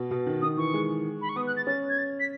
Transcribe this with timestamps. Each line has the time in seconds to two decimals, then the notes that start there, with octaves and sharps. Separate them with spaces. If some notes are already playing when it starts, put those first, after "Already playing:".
Already playing: B2
0.11 B2
0.26 D#3
0.42 D#3 D#6
0.57 E3 C#6
0.74 G#3
1.21 B5
1.29 C#6
1.36 B3 D#6
1.47 F#6
1.56 A6
1.67 C#4 A6
1.89 G#6
1.98 A6
2.20 B6